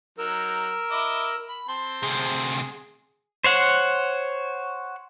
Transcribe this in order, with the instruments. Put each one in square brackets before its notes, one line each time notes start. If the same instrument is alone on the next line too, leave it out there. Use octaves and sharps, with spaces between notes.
[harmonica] F#3 D#4 [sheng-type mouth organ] A#4 E6
[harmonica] E4 D#5 D6
B5
C4 A5 C6
[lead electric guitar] D2 C3 [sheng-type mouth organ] G#4
[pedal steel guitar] C5 C#5 F#5